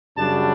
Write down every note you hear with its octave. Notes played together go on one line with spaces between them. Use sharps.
F#2 C#3 G3 D4 A5